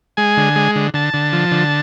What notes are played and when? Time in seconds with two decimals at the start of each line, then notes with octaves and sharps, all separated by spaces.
0.17 G#3 G#5
0.37 D3
0.56 G#3
0.76 D3
0.94 D3 A5
1.14 D3
1.33 F3
1.51 D3